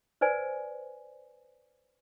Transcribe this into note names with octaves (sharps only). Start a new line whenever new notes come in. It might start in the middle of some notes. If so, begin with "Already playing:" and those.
B4 C5 D5 G#5